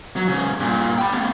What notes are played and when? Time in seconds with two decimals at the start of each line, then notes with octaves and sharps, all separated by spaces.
0.16 F#3
0.28 G#2 C#3
0.60 G2 A#2
0.99 G5 B5
1.12 A3 B3